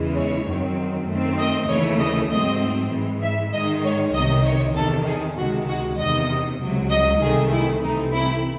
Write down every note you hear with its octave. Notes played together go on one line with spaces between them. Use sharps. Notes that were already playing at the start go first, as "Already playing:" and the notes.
Already playing: E2 C#3 E3 G#3
C#5
F#2 D#3 F#3 C4
F#2 D#3 A3 C4
D#5
D#2 C#3 E3 A3 C#5
D#5
G#2 F#3 A3 C4 D#5
G#2 E3 G#3
E5
G#2 D#3 G#3 D#5
C#5
C2 C3 D#3 D#5
C#5
E2 C3 D#3 A4
G#4
C#2 C3 D#3 G#3 F#4
F#4
E2 C3 D#3 D#5
C#2 C3 F#3
D#5
C2 C3 D#3 A3 C4 G#4
E4
C2 C3 E3 A3 C4 D#4
E4